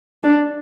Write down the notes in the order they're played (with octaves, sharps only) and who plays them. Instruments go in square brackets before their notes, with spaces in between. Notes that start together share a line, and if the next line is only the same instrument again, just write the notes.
[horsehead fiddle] D4